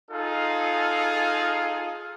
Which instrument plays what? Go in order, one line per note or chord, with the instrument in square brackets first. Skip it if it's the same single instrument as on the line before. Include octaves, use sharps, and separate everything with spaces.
[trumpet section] D#4 F4 G#4 A4 F5